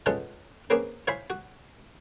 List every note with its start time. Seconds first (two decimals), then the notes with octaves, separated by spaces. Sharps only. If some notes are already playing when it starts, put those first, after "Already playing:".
0.06 G#3 B3 C#4 F4 F#4 A4
0.70 A#3 C4 C#4 G#4 B4
1.07 E4 C5 C#5 F5 G#5 B5
1.30 F#4